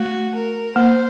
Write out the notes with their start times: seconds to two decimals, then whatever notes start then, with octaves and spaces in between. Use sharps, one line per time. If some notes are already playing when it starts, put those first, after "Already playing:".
Already playing: A3 F#4
0.35 A#4
0.76 A#3 C5